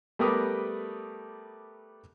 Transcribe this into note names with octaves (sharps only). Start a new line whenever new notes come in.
G3 A3 B3 A#4 D6 D#6